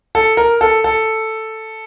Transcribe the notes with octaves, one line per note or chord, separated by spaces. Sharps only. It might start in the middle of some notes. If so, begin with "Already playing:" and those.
A4
A#4
A4
A4